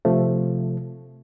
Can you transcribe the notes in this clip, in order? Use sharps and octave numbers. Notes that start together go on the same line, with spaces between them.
C3 F3 A3